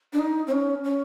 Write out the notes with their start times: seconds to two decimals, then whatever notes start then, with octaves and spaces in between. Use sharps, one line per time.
0.13 D4
0.19 D#4
0.47 C4
0.52 C#4
0.84 C#4